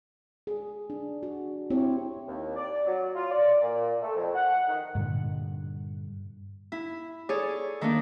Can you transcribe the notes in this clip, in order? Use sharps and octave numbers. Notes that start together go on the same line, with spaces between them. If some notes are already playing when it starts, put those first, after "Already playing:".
G#4
D4
F#4
C4 E4 G4 C5 C#5
D#2
D5
F#3
F4
D5
A#2
A3
F2
F#5
D#3
G2 A#2 D3 G3
E4
G#4 A4 C#5 D5
D#3 A3 A#3 D4 D#4